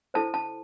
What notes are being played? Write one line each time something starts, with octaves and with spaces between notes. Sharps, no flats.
E4 A4 C5 A5
A5